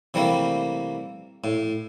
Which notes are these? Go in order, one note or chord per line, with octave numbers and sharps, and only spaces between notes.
C3 E3 G3 A3 A#3
A2